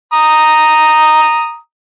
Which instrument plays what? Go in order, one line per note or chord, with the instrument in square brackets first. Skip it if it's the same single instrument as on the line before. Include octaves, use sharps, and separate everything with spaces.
[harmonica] A#5 D#6